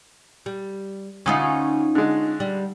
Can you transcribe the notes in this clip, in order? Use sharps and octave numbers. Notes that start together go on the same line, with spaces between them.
G3
D2 C#4 D#4 F4 D#6
D3 G#3
G3